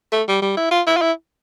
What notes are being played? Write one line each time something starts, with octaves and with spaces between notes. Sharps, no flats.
A3
G3
G3
E4
F4
E4
F4
E4